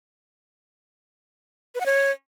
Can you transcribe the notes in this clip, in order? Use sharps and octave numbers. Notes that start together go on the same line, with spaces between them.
B4
F#5
C#5